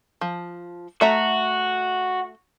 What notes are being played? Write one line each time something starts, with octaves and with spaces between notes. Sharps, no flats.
F3
A3 F#4 E5 A#5